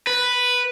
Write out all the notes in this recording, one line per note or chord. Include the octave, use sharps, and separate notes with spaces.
B4